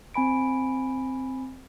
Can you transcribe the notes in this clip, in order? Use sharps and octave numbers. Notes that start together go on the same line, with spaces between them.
C4 G#5 B5 D7